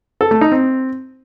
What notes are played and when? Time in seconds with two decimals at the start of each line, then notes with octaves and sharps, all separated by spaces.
0.21 A4
0.31 A3
0.41 D#4
0.52 C4